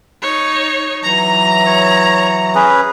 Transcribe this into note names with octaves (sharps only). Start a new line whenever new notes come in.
D#4 C#5
E3 F#3 A#5
C#5
C#4 G#4 B4